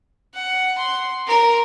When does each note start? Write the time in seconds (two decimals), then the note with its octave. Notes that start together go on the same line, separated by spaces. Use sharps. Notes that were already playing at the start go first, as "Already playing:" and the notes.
0.34 F#5
0.78 C6
1.28 A#4